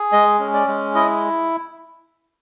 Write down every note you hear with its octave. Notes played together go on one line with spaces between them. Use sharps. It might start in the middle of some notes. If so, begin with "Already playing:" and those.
Already playing: G#4
G#3 D#5
C#4
D5
G#3
E4 D#5